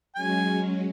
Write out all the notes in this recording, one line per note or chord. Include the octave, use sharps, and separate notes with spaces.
F#3 G#3 C#4 G#5